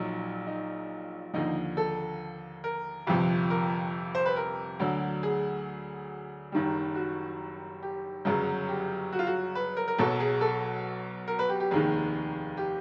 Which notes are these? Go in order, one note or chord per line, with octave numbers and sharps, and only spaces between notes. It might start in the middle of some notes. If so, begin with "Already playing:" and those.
Already playing: A#1 A#2 F#3 D#4
D#4
D#2 D3 F3 D#4
A4
A#4
G1 F2 C3 F3
A#4
C5
B4
A#4
D2 D3 F#3
G#4
F#1 F#2 D#3 G3
F#4
G4
G1 F#2 C#3 F#3 G#4
G4
F#4
F4
F#4
B4
A#4
A#4
B1 B2 F#3 A4
G#4
A4
A#4
B4
G4
G4
F1 D#2 D#3 G#4
G4